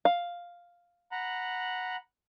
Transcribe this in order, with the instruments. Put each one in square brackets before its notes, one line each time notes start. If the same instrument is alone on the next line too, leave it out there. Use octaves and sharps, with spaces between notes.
[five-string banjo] F5
[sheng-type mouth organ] F#5 A#5 B5